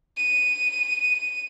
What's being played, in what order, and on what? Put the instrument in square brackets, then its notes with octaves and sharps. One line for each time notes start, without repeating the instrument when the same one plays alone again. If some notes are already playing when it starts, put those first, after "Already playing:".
[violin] D#7